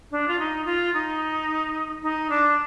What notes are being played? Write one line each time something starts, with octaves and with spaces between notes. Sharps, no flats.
D4
F4
D#4
F4
D#4
D#4
D4